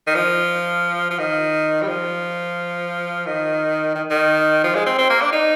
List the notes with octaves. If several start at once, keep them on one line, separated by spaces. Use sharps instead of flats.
D#3
F3
F3
D#3
G3
F3
D#3
D#3
D#3
F3
G#3
C4
C4
A#3
D4
D#4